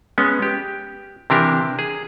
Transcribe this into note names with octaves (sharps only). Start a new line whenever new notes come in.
G#3 B3 C#4
G4
C3 E3 D4 G4 A#4
G#4